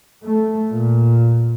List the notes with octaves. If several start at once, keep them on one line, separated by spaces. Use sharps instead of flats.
A3
A#2